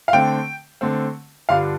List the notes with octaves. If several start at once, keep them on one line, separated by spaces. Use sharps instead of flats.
F5
D3 A3 C4 G5
D3 A3 C4
G2 D3 G3 D4 F4 F5